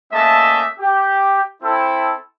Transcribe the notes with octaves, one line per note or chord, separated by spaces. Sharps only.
A3 A#3 C#4 D#5 E5 A5
G4
C4 E4 A4